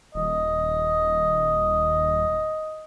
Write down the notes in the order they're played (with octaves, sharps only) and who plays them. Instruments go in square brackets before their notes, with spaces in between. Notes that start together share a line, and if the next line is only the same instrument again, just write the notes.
[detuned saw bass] D#1 [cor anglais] D#5